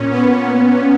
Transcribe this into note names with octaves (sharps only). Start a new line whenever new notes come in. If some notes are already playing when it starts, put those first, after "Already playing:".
Already playing: A#2 C#4
B3